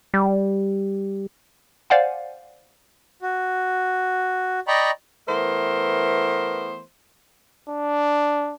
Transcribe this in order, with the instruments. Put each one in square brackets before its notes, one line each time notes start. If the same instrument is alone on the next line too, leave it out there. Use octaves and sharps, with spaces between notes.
[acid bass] G3
[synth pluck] C5 D5 F5 F#5 G#5
[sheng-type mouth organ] F#4
D5 D#5 G5 A#5 B5 C#6
[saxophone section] E3 A3 B3 A#4 C5
[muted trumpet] D4